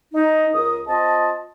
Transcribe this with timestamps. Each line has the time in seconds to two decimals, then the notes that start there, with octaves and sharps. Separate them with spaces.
0.14 D#4
0.54 C#2 A#4 D#6
0.88 C4 F4 D#5 A5